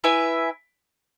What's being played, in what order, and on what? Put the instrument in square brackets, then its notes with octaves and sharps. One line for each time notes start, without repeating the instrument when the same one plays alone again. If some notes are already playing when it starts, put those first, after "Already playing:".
[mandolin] E4 B4 E5 G#5